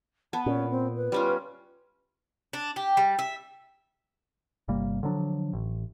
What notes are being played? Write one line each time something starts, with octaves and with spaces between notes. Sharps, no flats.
B3 A5
A#2 C#4
C4
B4
G3 C#4 F4
D4
G4
G3
E5
G1 C3 G3 A#3
D3 F3 F#3 D4
A1